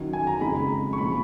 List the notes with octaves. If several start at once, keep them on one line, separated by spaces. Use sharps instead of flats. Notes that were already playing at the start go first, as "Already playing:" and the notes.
Already playing: F#2 D#3 F#3
G#5
A#5
F2 C#3 G#3 B5
C#6
A#2 F3 G#3 B5